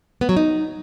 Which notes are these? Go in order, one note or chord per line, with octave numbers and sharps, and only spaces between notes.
B3
F#3
D#4